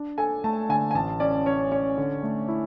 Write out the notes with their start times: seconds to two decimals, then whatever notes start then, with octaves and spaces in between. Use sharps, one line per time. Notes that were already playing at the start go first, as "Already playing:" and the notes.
Already playing: D4
0.18 A4 G#5
0.44 A3 A5
0.69 D3 G#5
0.91 G#5
0.95 A1 A5
1.20 C#4 D5
1.46 C#4 C#5
1.72 C#4 C#5
1.98 D3
2.23 A3
2.49 E4